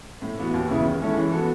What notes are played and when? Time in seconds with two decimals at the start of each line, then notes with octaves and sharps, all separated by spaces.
0.22 A2
0.37 E3 B3 F#4
0.54 D#2
0.69 C#3 E3 B3 E4
0.84 D#3
1.00 G#3 C#4 E4 A4
1.16 E3
1.32 B3 F#4 A4